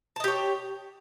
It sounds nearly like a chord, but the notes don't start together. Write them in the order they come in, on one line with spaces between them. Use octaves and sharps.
A5 D#5 G4 C#5